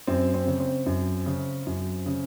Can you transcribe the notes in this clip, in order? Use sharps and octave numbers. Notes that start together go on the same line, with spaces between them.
F#2 C4
C4
C#3
C4
F#2
C#3
F#2
C#3